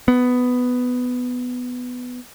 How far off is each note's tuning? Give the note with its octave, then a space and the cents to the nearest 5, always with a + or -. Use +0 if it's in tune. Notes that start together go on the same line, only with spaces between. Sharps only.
B3 +10